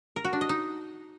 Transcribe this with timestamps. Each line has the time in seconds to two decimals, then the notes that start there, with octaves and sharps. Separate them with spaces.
0.16 A#4
0.25 F#4
0.33 D4
0.41 D#5
0.49 D#4